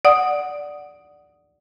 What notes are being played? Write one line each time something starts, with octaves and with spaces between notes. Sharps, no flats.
D5 F#5 D#6